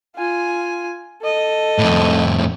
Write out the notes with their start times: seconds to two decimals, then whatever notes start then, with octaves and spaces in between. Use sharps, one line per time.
0.16 F4 G#5
1.22 A4 D#5
1.79 F2 A2